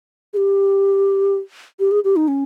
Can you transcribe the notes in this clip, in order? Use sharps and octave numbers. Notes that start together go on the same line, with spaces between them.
G#4
G4
G4
G#4
G4
D#4
C#4